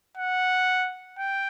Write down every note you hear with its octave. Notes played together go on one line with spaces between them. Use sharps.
F#5
G5